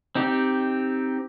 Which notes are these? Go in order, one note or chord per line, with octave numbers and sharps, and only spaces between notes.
C4 D#4 G4